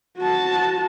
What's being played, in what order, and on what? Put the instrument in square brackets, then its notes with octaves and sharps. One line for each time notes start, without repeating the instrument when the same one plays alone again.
[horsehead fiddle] F#4 A5